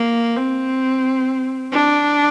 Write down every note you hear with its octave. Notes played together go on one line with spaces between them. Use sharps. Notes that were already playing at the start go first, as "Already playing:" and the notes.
Already playing: A#3
C4
D4